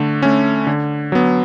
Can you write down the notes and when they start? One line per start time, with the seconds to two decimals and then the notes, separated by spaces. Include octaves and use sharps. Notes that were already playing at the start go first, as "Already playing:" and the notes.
Already playing: D3 A3
0.22 A3 C#4
0.67 D3
1.12 F#3 B3